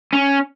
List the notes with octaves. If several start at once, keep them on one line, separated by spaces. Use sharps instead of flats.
C#4